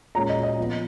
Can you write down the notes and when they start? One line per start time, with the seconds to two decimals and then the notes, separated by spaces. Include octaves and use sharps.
0.15 A#2 G#3 C#4 A#5
0.29 D#5
0.43 D#5
0.58 F3 B3